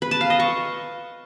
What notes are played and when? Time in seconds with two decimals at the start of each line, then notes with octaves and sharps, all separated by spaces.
0.02 B4
0.11 A5
0.21 F5
0.30 D#5
0.40 C#6